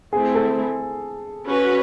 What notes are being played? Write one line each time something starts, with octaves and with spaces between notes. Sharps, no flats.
A3 C4 E4 G#4
A4
C#4 F#4 B4